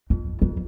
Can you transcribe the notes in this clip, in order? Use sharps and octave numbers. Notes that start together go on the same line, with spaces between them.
F2
F2